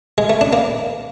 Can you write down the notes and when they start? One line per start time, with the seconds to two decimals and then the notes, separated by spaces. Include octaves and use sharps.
0.18 G#3
0.30 A3
0.41 D4
0.53 A#3